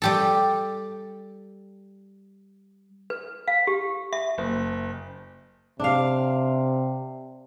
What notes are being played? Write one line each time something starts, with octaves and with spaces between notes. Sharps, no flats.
G3 G4 A4
B4
F5
G4
E5
F#1
C3 D4 F5